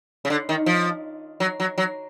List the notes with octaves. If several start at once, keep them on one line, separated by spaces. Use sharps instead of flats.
C#3
D3
D#3
F3
F#3
F#3
F#3